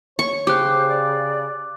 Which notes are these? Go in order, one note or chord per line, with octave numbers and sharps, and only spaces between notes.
C#5 C#6
C#3 G4 C5 D6 F#6
D5